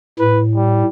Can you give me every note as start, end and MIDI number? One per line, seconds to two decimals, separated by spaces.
0.19 0.83 45
0.19 0.41 71
0.55 0.88 55